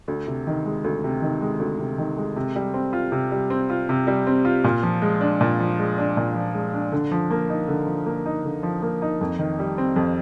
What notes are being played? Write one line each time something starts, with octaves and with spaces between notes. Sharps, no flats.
D2
C3
D#3
G#3
D2
C3
D#3
G#3
D2
C3
D#3
G#3
C3
G3
C4
F4
C3
G3
C4
F4
C3
G3
C4
F4
A#2
F3
G#3
D4
A#2
F3
G#3
D4
A#2
F3
G#3
D4
D3
F3
A#3
D#4
D3
F3
A#3
D#4
D3
F3
A#3
D#4
F2
D#3
G3
C4
F2